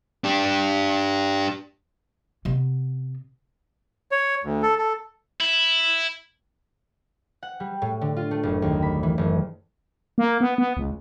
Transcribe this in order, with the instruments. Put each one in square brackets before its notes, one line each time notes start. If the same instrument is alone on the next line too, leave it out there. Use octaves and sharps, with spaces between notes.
[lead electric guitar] D4 G4
[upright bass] C3 B3
[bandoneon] C#5
D2
A4
A4
[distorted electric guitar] E4
[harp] F#5
G3
A2
D3
F4
A3
F#1
D#2
B5
E3
F#1
[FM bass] A#3
B3
B3
C#2